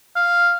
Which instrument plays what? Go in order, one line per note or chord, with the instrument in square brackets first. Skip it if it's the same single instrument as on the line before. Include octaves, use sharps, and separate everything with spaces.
[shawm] F5